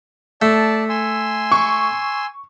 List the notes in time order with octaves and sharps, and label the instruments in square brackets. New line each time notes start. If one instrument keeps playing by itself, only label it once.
[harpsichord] A3 [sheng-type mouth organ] D5 A5
[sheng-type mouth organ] G#5 C6 E6
[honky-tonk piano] C#6